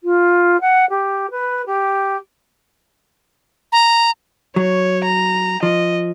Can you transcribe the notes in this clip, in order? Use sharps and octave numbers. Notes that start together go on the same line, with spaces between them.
F4
F#5
G4
B4
G4
A#5
F#3 C#5
A#5
F3 D#5